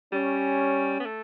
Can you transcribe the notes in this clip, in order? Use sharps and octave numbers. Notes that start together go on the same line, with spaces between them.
G3 C#4
B3
A3